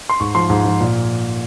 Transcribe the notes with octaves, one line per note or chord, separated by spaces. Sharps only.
C6
G#2 C#6
F3 C6
G#2
F3
A#2